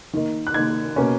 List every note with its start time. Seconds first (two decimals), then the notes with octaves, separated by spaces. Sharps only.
0.13 D#3 A#3 D#4
0.47 F#6
0.54 D#3 A#3 D#4 G#6
0.96 B2 A#3 C#4